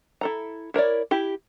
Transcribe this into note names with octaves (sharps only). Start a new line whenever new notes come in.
E4 A4 A#5
E4 A#4 C#5 D5
E4 G4